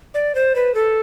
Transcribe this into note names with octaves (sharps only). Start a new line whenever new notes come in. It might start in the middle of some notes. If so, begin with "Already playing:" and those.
D5
C5
B4
A4